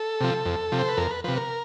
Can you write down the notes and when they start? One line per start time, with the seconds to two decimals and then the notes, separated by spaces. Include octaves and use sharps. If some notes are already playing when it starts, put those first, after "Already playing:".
Already playing: A4
0.20 C3 F3
0.45 F2
0.72 C3 F3
0.79 C5
0.89 B4
0.97 F2 A#4
1.11 B4
1.24 C3 F3 B4
1.37 A#4